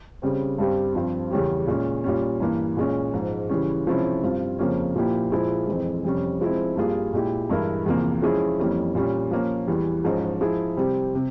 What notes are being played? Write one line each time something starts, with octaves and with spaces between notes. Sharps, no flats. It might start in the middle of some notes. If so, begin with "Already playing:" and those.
C#3 G3 C4
G2 G3 C4 G4
G2 F3 C4
E2 C#3 G3 C#4 G4
A#2 G#3 C#4
A#2 G3 C#4
G2 E3 A#3
A#2 G#3 C#4
G#2 F3 G#3
C#3 E3 G3 C#4
C3 F3 G#3 C#4 E4
G2 G3 C4 F4
F2 C#3 F3 A#3 C#4
A#2 F3 A#3 E4 G4
A#2 F3 G#3 E4 G#4
F2 E3 G#3 C4
F2 C3 G3 C#4
F3 G#3 C4 E4
G2 G3 A#3 F4 G#4
A#2 G#3 E4 G4
G2 E3 G#3 E4 A#4
E2 C3 F3 A#3
F3 G#3 C#4 E4 G#4
F2 E3 G3 A#3 C#4
A#2 G3 C#4
F3 A#3 C#4
E2 E3 G3
G#2 F3 G#3 C#4
F3 G#3 E4 G#4
C3 G3 C4 G4
C3